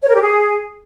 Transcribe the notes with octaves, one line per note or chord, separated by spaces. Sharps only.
C#5
A#4
G4
G#4